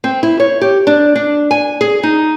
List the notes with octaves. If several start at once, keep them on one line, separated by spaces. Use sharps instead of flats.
C4
E4
C#5
G4
D4
D4
G#5
G#4
D#4